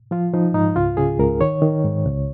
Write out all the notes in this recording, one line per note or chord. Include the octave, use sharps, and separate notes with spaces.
F3 F4
F3 D#4
G#2 D#4
C#2 F4
C#3 G#4
C#2 A#4
D#3 C#5
D#3
G#2
C#2